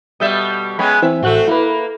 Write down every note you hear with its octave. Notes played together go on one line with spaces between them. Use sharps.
B2 G3 E5 D#6 G6 A6
G#3 B3 C#4 G5 G#5 B5
E3 C4 E5
A1 A3 C4 F#4 F#6
A#3 E4 B4